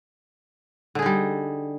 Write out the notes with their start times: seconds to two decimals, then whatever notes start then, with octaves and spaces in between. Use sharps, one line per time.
0.95 D3
0.99 G#4
1.02 D#4
1.06 G3